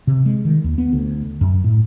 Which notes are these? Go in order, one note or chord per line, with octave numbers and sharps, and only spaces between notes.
C3
G#3
D#3
D#2
B3
D2
F#2
A2